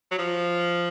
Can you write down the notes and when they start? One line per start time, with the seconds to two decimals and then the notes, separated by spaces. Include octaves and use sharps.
0.11 F#3
0.18 F3